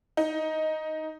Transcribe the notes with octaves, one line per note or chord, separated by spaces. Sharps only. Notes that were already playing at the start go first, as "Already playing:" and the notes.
D#4